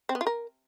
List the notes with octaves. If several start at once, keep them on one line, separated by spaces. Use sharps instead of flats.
C4
B3
F4
A#4